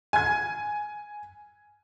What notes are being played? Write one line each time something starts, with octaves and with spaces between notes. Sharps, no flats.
G#5 G#6